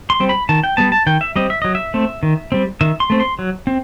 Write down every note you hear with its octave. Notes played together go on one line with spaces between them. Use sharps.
C6
G3 C4
B5
D#3 A5
G5
G3 B3 A5
A5
D#3 G5
E5
G3 C4 D#5
E5
F#3 D#5
E5
A3 C4
D#3
G3 C4
D#3 E5
C6
A3 C4
C6
F#3
C4